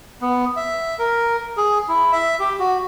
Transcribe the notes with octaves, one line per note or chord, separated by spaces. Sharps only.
B3
E5
A#4
G#4
E4
E5
G4
F#4